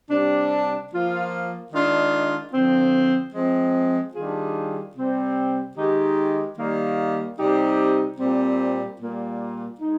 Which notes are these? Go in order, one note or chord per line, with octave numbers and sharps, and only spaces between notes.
C3 G3 D4
F3 A#3 F4
D#3 G#3 D4 F4
D3 F3 C4
F3 G#3 C4
D#3 G3 D4 F4 G#4
C3 G3 C4
D#3 G#3 D#4 G4
D#3 G3 A#3
C3 G3 C4 D#4 G4
A#2 G3 C4
A#2 G3 A#3
G#3 D#4